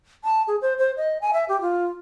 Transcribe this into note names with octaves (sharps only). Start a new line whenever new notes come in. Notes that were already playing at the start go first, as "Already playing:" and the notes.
A5
G#4
C5
C5
D#5
G#5
E5
G4
F4